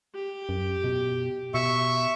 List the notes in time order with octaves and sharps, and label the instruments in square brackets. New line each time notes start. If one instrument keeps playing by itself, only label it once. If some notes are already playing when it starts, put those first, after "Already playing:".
[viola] G4
[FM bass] F#2
B2
[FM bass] B2 [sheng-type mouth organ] E5 C#6